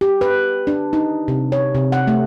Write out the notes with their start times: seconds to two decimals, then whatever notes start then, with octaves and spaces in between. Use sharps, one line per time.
0.01 G4
0.21 B4
0.67 D4
0.93 D#4
1.28 C3
1.52 C#5
1.75 C3
1.92 F#5
2.07 A3